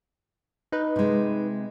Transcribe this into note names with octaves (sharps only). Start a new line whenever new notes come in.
D#4 B4
C3 G#3